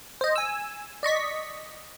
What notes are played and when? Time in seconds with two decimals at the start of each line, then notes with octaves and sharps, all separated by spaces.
0.21 C5 D#5
0.36 G#5 E6
1.03 D5 D#5 C#6 B6